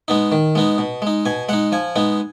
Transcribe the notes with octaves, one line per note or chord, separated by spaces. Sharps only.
G#3 B3 D#4
D#3
G#3 B3 D#4
B2
G#3 D#4
B2 G#5
G#3 D#4 F#5
F3 G#5
G#3 B3 D#4